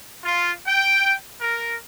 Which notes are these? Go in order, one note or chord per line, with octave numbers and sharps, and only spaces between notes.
F4
G5
A#4